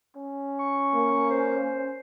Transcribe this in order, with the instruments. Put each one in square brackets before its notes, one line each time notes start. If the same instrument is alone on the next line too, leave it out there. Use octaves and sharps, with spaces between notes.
[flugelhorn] C#4
[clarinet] C#6
[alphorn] A#3
[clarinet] C5